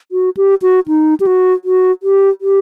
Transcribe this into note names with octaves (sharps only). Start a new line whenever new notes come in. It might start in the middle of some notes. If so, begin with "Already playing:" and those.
F#4
G4
F#4
D#4
G4
F#4
F#4
G4
G4